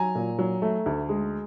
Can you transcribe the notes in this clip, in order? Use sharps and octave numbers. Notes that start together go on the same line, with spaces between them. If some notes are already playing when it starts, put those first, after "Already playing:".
Already playing: F#3 G#5 A#5
A#2
F#3
A3
D2
G#3